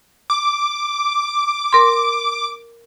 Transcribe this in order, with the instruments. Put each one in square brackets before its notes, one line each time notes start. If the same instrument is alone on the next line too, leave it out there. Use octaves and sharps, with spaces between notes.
[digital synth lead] D6
[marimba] A#4 C6